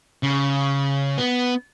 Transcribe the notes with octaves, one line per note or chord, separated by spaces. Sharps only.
C#3
B3